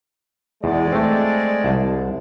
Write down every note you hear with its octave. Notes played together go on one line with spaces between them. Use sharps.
E2 G#3 D5
A3 C4
C2 A5